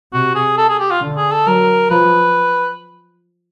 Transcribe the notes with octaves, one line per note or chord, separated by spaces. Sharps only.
C3 F#4
G#4
A4
G#4
G4
F4
D3
G#4
A4
F#3 A#4
F3 B4